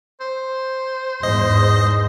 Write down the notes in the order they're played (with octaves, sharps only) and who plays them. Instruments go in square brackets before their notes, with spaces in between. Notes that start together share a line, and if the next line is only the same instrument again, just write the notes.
[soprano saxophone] C5
[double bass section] E2 G#2 [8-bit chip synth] D#5